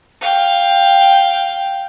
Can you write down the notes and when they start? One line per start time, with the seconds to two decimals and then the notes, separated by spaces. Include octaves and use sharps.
0.21 F5 G5